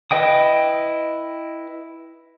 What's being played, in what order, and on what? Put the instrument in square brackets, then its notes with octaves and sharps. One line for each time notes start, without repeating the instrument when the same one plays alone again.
[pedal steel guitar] E4 B4 D#5 G5 D#6